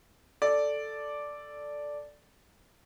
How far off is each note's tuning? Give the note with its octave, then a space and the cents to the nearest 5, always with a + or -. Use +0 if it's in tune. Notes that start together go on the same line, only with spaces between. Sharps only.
A4 +0 D5 +0